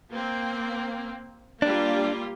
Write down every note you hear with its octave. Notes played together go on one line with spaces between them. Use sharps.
A#3 C4
G3 A#3 D4 F4